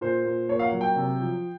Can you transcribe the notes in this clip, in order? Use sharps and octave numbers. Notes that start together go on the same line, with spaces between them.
A#2 C5
A#2
A#3 C#5
F5
F#5
F#3
G5
C3
F3